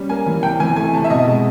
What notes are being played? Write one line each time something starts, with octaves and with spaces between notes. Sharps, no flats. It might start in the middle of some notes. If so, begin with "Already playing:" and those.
Already playing: G3 C#4
A#3 G#5
E3
C3 G5
E3 G#5
A3 G#5
C3 A5
E5
B2 D#5
G#3